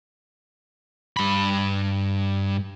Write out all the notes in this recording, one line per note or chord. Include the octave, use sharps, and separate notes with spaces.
G2 B5